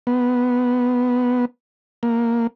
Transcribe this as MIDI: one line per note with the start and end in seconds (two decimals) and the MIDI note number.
0.07 1.45 59
2.03 2.47 58